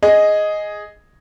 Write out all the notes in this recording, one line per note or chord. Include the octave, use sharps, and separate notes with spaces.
G#4 D#5